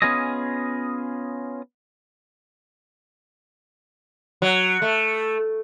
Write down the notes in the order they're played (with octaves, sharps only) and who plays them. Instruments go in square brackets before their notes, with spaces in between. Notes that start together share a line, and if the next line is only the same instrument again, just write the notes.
[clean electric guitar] B3 C#4 F4 G#4 D#5
[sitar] F#3
A3